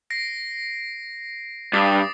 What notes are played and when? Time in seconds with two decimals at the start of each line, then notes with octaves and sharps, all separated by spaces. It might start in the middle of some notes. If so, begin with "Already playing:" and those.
0.10 A#6 C7 D7
1.73 G2 D6 D#6 A6